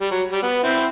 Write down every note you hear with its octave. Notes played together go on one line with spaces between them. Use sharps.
G3
F#3
G3
B3
C4 E4